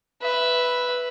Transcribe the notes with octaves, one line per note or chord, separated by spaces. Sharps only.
B4 E5